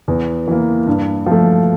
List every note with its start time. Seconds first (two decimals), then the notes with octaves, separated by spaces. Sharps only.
0.08 E2
0.47 E3 A#3
0.87 G2
1.26 F3 A3